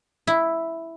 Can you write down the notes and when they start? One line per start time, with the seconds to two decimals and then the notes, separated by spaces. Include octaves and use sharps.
0.27 E4